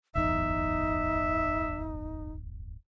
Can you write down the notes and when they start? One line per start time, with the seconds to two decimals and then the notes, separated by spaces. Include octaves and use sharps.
0.15 D1 G1 E2 D#4 E5